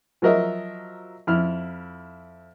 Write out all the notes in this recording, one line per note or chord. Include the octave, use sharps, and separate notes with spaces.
F3 F#3 A#4 D#5 E5
F2 E4 F6